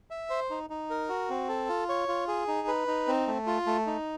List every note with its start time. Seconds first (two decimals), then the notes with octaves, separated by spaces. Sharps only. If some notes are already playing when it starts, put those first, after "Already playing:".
0.11 E5
0.30 C5
0.50 D#4
0.70 D#4
0.90 A#4
1.09 F#4
1.29 C4
1.49 A4
1.69 F4
1.89 C#5
2.08 F4
2.28 G#4
2.48 D#4
2.68 B4
2.88 D#4
3.08 C4
3.27 A3
3.47 F4
3.66 A3
3.86 D#4